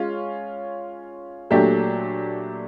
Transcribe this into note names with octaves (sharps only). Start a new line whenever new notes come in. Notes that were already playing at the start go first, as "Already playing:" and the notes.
Already playing: G#3 C#4 F4
A#2 F#3 A3 D4 G4